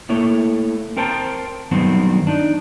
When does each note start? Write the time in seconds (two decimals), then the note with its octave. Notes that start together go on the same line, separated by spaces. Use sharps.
0.09 A3 A#3 E4 C#5
0.96 C4 A#4 C5 G5 A5
1.71 G2 D#3 F#3 B3 C4
2.27 D4 D#4